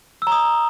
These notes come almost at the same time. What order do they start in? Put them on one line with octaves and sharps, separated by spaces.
E6 A#5 D#6